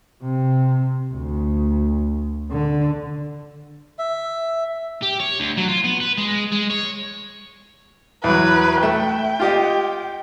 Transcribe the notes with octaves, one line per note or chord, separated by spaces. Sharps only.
C3
D2
D3
E5
G4
C#5
D2
F#3
F4
B3
B4
G#3
G#3
C#5
E2 F#3 B4
A3 E5 G5
F4 G4 D#5